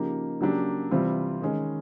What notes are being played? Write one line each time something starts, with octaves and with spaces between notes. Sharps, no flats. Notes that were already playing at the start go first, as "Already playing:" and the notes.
Already playing: C#3 F3 A#3 D#4 G4
C#3 F#3 A#3 D4 G4
C3 E3 G3 C4 F4
D#3 G#3 C#4